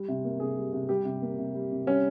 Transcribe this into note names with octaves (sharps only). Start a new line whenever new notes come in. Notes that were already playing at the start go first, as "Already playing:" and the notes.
Already playing: G3
C3
A#3
C3 G#4
G3
C3
G3 G4
C3
A#3
C3
G3
C3
G3 C#4